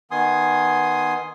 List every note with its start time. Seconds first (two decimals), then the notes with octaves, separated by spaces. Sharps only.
0.11 D#3 B3 G#5 C6 D#6